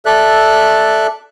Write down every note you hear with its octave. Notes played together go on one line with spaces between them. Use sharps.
A4 D5 E5 F#6